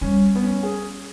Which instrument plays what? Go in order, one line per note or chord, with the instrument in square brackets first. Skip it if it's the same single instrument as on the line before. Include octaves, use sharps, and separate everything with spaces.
[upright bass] G3 [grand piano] C#4
[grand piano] B3
C#4
G#4